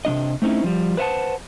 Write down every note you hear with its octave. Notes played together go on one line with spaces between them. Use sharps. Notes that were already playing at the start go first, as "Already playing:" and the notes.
C3 D#3 D4 D#5
A3 C4 C#4 D#4 E4
F3 G3
B4 C5 E5 F#5 A5